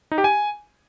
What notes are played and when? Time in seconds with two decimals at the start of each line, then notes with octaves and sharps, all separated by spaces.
0.12 D#4
0.18 G4
0.24 G#5